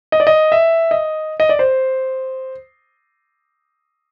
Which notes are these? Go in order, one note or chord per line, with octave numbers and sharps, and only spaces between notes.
D#5
D5
D#5
E5
D#5
D#5
D5
C5